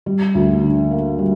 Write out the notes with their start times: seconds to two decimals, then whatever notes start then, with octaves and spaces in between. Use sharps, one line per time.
0.06 G3
0.35 D2
0.63 D3
0.91 A#3
1.18 G3